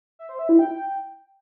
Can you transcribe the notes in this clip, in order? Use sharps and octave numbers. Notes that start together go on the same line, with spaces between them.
E5
C5
E5
E4
G5